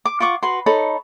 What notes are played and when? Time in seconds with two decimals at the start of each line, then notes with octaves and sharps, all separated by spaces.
0.05 D6
0.20 F4 F#5 C#6 D6
0.43 F#4 B4 C6
0.66 D#4 A4 C#5 B5